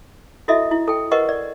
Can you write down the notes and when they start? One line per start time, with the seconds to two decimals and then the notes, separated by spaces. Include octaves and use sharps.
0.48 E4 F#4 A4 D#5 E5
0.71 E4
0.88 A4 G5
1.11 G4 A#4 B4 D#5 F#5 C#6
1.29 D5